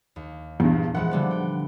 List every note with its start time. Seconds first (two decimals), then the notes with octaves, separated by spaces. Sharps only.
0.16 D#2
0.60 E2 G2 A#2
0.95 E3 F3 G#3 F#5
1.11 D3 G3 B3
1.31 G5